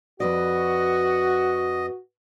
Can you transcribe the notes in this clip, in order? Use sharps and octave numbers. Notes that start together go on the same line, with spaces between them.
F2 F#4 B4 D5 D#5